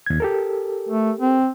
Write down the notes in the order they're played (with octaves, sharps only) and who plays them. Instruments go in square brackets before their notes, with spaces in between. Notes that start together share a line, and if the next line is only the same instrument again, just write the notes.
[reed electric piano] D#2 G#6
G4 A4 A#4
[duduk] A3
C4